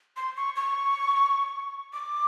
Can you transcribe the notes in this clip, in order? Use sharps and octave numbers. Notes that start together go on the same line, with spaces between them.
C6
C#6
C#6
D6